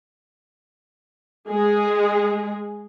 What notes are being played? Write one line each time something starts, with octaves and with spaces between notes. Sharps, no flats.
G#3 G#4